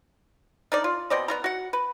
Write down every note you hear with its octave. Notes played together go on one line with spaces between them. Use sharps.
D4 D#4 A#4 D5
F4
B2 C4 D5 D#5
B3 F4 A#5
F#4 F#5
B4